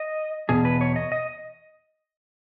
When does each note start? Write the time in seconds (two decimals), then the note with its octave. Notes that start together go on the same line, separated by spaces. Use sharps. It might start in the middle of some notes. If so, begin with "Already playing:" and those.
Already playing: D#5
0.49 E2 B2 G#4
0.65 B4
0.81 C#5
0.96 D#5
1.12 D#5